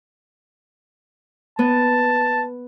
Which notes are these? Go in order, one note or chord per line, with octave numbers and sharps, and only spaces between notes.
B3 A5